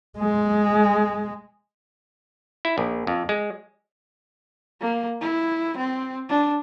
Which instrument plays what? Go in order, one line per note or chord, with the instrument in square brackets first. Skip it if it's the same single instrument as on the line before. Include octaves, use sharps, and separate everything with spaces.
[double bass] G#3
[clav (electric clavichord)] E4
A#1
F2
G#3
[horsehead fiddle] A#3
E4
C4
D4